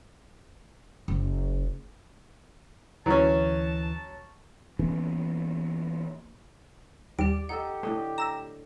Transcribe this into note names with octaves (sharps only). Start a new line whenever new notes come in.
F#1
D2 E3 F#3 C#4 A5
E3 A#3 B3 C#4
D#2 G3 G4 D5 D7
D#4 G4 A4 D#5 F#5
A2 D3 A3 D#5
A#5 E6 A#6 E7